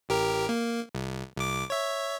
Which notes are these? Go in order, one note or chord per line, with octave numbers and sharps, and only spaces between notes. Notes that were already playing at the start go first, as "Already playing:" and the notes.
A1 G4 A#4
A#3
C2
C2 D6
C#5 E5